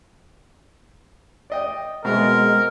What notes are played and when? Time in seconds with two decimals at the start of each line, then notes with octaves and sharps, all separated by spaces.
1.50 D5 D#5 G5
2.05 B2 G#3 C4 A#4 E5